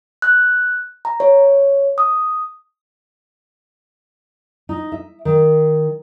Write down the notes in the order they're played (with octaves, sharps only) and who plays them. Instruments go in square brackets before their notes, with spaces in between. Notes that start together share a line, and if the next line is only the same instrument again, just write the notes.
[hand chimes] F#6
A#5
C#5
D#6
[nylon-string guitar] D#4
E5
D#3